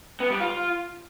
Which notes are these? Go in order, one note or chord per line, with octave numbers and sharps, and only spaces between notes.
B3
G3
F4